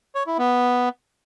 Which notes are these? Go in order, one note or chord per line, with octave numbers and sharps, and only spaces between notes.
C#5
E4
B3